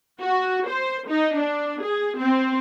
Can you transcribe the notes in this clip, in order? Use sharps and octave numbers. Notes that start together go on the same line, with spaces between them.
F#4
C5
D#4
D4
G#4
C4